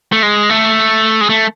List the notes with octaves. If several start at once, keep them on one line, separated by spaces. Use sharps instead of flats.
A3
G#3
A3
G#3
A3